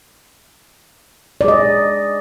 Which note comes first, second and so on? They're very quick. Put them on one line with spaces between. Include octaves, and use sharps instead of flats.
D5 G#4 D#5